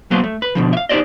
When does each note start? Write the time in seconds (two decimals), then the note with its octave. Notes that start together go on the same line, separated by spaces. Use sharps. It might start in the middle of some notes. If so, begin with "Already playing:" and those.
0.11 F#3 A#3 B3 C5
0.24 A3
0.42 B4
0.55 B2 D3 F3
0.73 E5 F5
0.89 D#4 G4 G#4 C5 D5 D#5